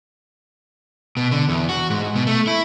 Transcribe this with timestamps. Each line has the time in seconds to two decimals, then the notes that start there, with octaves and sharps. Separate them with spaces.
1.17 B2
1.31 D3
1.49 E2
1.69 F#4
1.90 G#2
2.16 B2
2.27 A3
2.47 E4